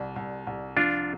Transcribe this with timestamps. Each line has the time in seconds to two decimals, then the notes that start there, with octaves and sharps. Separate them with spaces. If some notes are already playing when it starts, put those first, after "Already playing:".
Already playing: C2 G3
0.16 C2
0.47 C2
0.77 F3 D4 F4